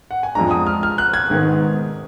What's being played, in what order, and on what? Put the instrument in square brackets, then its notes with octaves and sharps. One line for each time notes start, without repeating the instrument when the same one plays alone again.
[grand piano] F#5
G#5
[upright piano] F2 F3 G#3 D4 [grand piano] A#5
[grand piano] D#6
F6
F6
F#6
G#6
[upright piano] G#2 D#3 G#3 B3